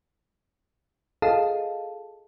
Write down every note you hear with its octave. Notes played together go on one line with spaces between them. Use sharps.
F4 G#4 A4 D#5 F5 A5